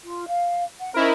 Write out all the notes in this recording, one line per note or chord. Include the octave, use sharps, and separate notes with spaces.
F4
F5
F#5
C#4 D#4 E4 A#4 C5